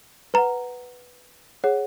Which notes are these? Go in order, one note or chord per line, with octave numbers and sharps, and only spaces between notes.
B4 F#5 A#5
G#4 C#5 F#5